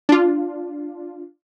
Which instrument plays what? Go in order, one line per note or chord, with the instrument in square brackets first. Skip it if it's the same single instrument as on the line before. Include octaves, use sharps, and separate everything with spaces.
[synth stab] D4 F4